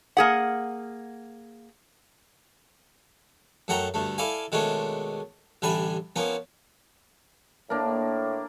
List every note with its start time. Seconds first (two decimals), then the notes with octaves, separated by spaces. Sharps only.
0.17 A#3 G#4 F#5
3.68 F#2 A3 F#5 G5 A#5
3.94 D2 G2 A3
4.18 E4 A4 D5 F5 G#5
4.52 B2 D#3 G#3 A3 C#4 D4
5.62 A1 D3 G3 E5 G#5 B5
6.16 F3 A#3 B3 C#4
7.70 A2 A#3 D4